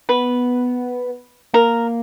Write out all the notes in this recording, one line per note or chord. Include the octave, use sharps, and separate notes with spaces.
B3 B4
A#3 A#4